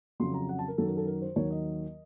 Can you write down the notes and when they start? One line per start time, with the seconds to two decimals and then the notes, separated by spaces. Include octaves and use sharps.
0.20 F2 C#3 F#3 C6
0.34 A#5
0.49 F#5
0.59 A5
0.68 A#4
0.78 F#2 D#3 F#3 A4
0.87 A#4
0.97 A4
1.07 A#4
1.22 C5
1.36 D#2 D#3 F#3 C#5
1.51 D#5